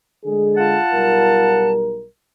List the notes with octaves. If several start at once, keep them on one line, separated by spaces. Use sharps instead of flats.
D3 G#3 G#4
F4 F#5 A5
B1 G3 A#4